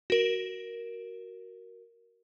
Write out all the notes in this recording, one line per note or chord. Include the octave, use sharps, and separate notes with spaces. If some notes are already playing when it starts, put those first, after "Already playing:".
F#4 A#4